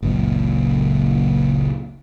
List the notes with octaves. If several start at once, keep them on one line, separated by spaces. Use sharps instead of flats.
F#1 C#2 F#2 A#2